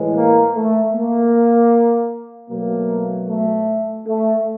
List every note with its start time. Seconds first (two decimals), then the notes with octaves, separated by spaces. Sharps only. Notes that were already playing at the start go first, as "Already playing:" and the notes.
Already playing: A2 E3 G#3
0.15 A#3
0.54 A3
0.93 A#3
2.50 B2 F#3 A3 A#3
3.28 A3
4.06 A3